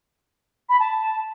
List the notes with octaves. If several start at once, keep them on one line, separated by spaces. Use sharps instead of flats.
B5
A5